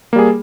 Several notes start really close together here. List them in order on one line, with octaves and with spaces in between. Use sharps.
A#3 G3 G#4